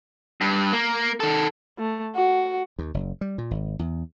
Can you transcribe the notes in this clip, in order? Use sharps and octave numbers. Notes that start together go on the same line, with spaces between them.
G2
A#3
D#3 A4
A3
F#4
D#2
F#1
G3
A#2
G#1
E2